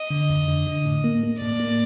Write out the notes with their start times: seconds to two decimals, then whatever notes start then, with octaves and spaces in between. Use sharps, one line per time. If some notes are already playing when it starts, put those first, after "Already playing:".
Already playing: D#5
0.10 D3
0.30 F2
0.48 D3
0.67 D3
0.85 A2
1.04 A#3
1.23 A#3
1.42 A2 D5
1.60 A#3